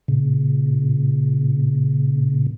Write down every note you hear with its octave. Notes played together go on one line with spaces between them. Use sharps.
A#2 C#3